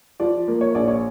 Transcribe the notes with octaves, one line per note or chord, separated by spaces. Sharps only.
F3 D5
A#3
C#5
A#1 D5
C#5